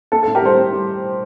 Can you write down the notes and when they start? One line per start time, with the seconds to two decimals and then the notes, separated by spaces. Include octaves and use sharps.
0.12 A#3 A4
0.23 A2 A4
0.35 G4 A#4
0.42 G3 A4 C5
0.57 A2
0.72 G3